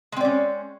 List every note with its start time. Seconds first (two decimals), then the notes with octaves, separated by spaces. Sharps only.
0.12 G#3
0.16 C4
0.21 D5
0.25 C#4